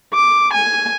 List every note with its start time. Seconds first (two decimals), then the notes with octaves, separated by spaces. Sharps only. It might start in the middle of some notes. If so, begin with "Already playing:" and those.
0.14 D6
0.53 G#5